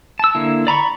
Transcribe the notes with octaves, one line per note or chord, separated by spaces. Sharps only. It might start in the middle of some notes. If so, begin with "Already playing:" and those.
A5 E6
D3 A#3 E4
D5 A#5 B5 C#6